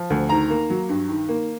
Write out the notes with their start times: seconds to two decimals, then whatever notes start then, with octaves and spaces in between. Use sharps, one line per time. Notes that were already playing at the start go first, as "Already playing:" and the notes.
Already playing: F3
0.10 D2
0.29 D#3 A#5
0.50 A#3
0.70 F#3
0.89 G2
1.09 D#3
1.29 A#3